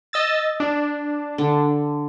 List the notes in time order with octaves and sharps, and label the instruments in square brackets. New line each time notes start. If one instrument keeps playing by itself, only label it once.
[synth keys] D#5 E6 A6
D4
[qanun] D3